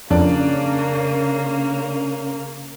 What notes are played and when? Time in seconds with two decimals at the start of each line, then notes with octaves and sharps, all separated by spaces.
0.10 F2 C#3 A#3 C#4 D4 D5 A5